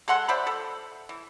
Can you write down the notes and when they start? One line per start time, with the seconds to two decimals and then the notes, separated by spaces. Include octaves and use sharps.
0.08 G#3 A4 F#5 C6
0.28 C5 D5 E5 B5
0.47 A4
1.09 E3